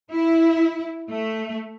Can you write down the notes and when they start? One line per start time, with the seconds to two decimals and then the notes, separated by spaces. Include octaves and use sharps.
0.12 E4
1.08 A3